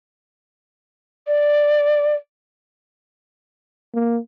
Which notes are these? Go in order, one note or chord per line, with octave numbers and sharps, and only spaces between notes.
D5
A#3